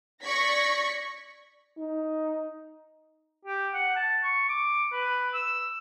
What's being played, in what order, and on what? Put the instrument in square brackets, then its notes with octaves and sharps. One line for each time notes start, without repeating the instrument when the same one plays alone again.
[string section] D5 C#6 G#6 A#6 B6
[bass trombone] D#4
[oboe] G4
F#5
A5
C#6
D6
B4
E6